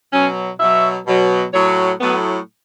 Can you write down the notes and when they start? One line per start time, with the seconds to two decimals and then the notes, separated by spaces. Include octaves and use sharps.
0.13 B2 F#3 C#4
0.60 B2 F#3 E5
1.06 B2 F#3
1.54 A2 F#3 C#5
2.00 A2 F#3 B3